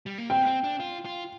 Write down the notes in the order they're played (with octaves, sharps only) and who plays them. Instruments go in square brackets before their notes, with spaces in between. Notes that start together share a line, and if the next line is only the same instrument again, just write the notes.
[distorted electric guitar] G3
A#3
[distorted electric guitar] C4 [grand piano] G5
[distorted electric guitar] C4
D4
F4
F4